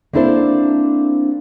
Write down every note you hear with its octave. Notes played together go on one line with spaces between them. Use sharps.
A#3 C4 D4 E4 A4 C5